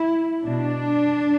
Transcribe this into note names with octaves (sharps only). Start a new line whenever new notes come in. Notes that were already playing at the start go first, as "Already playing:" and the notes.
Already playing: E4
B2 D4